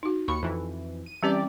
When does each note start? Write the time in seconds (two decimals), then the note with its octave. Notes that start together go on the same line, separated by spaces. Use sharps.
0.03 D#4 F#4
0.28 D#2 B5 C#6 C#7
0.43 F2 E3
1.06 D#7
1.23 E3 G3 C4 C#4 G4 D5